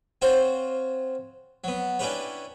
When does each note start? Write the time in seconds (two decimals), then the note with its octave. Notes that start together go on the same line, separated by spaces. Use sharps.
0.22 C4 F4 F#4 C5 C#5
1.64 F#3 B3
1.99 C#4 D4 E4 G4 B4 C#5